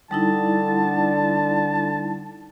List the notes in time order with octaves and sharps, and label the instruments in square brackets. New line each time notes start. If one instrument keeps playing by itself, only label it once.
[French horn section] D3 [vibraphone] G3 D#4 E4 [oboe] A5